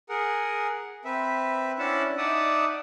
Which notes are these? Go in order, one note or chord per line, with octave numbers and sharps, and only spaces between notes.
G#4 A#4 F#5
C4 B4 E5
C#4 D4 E4 E5 F#5 A5
D#4 D5 E5 F#5 A5 D#6